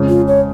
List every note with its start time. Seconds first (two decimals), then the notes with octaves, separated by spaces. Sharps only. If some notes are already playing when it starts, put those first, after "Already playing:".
Already playing: F2 C#3 G#3 C#4
0.09 F4
0.28 C#5